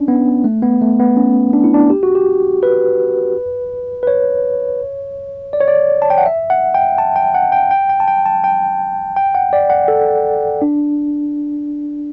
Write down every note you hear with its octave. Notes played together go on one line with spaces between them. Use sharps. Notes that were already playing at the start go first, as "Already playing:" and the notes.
Already playing: C#4 D4
B3
A3
B3
A3
B3
C#4
D4
E4
D4
G4
F#4
G4
B4
B4
C#5
D5
C#5
D5
A5
G5
F#5
E5
F#5
G5
A5
G5
F#5
G5
G5
G5
A5
G5
A5
G5
G5
F#5
D5
F#5
A4
D4